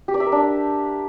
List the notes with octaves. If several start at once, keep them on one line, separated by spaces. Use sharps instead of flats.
G4
D5
E5
A#4
D4